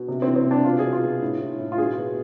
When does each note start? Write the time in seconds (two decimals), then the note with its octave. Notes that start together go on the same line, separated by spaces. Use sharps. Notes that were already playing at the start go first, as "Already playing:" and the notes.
Already playing: B2
0.08 C3
0.22 E3 C4
0.36 C4
0.45 C3
0.51 D4
0.64 B2 F4
0.79 G#4
0.84 B2
0.93 F4
1.03 B2
1.22 A2
1.41 A2
1.59 A2
1.72 F4
1.78 B2 G#4
1.97 B2